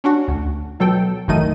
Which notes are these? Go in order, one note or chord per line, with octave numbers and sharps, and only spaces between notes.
C#4 D4 F#4
D2
B2 F#3 A4 G5
A1 F#2 D#3 A3 D#4 D#7